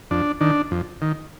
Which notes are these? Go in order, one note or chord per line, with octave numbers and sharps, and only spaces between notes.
F2 D4
D#3 D4
F2
D#3